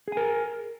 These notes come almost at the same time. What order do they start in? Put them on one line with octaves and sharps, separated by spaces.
G#4 G#5 A#4